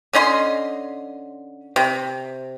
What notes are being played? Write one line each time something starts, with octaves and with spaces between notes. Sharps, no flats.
D3 C#4 D#5 C6
C3